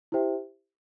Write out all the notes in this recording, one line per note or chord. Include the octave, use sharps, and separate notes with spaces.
E4 G4 C5 E5 G5